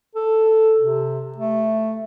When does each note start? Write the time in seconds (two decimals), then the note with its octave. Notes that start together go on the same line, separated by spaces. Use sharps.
0.16 A4
0.80 C3
1.38 A3